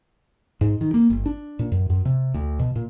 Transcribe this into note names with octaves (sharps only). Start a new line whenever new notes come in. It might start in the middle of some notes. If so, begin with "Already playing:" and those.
G#2
D#3
A#3
G1
D4
A#2
F#2
F#2
C3
D2
B2
A#2